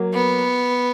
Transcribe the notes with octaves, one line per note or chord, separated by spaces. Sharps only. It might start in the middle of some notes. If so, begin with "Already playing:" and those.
Already playing: F#3 A#3
B3